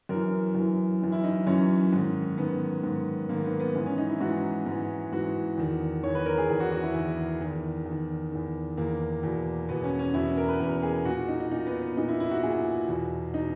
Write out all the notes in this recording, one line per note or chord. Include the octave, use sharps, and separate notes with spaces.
F#2 E3 A#4
F#2 E3
F#2 E3
E4
D#4
F#2 E3 C#4
G#2 D#3
G#2 D#3 B3
G#2 D#3
G#2 D#3 A#3
B3
B3
G#2 E3
C#4
D#4
E4
G#2 E3 F#4
G#2 E3
G#2 E3 F#4
E2 D#3
E2 D#3 C#5
B4
A#4
G#4
E2 D#3 G#4
F#4
F#4
E4
E2 D#3
E2 D#3
E2
D#3
E2 D#3
E2 D#3 A#3
E2 B2
E2 B2 B3
C#4
C#4
E2 B2 E4
A#4
B4
E2 B2 A#4
G#4
A#2 F#4
D#4
D#4
A#2 D#4
B3
B3
A#2 D#4
E4
E4
F#4
A#2 G#4
E2 B2
B2 D#4